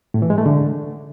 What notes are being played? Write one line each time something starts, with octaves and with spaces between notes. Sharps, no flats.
A2
E3
G#3
A3
D3